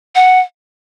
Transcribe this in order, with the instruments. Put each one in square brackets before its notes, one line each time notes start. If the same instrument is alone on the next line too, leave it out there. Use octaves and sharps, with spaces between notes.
[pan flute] F#5